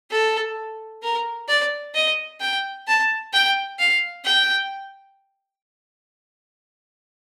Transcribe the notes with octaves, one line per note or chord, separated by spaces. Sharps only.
A4
A#4
D5
D#5
G5
A5
G5
F5
G5